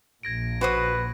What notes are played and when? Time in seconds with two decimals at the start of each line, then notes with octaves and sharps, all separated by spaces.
0.23 A#1 A#2 G#6 A#6 D7
0.61 F#4 B4 C5 D#6